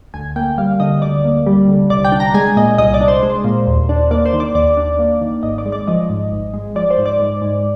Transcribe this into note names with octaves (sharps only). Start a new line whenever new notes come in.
D2 G#5
A#3 G5
G3 F5
D3 D#5
D2 D5
A#3
G3
D3
C2 D5
G5
D4
A#5
G#3 G#5
A#2 D#5
C2 D#5
D5
D4
C5
G#3
A#2
D#2
D4
A#3 D5
C5
D#3
D5
D#2 D5
D4
A#3
D#3
G#1 D#5
D5
G#3
D5
F3 D#5
G#2
G#1
G#3
F3 D5
C5
G#2
D5
G#2
G#2